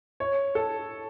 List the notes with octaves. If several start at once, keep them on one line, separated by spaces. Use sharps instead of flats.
C#5
A4